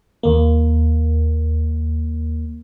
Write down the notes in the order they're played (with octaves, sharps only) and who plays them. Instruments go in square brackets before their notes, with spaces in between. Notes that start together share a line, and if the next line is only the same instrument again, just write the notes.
[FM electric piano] D#2 A#3